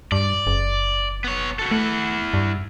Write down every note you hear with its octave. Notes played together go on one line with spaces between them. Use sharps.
G2 D5
F#1
B3 C#5
F#4 A4
A3 E4 F#5
G2